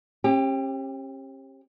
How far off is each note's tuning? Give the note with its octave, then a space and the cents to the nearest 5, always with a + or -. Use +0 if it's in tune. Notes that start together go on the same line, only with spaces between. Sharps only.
C#4 -45 G4 +15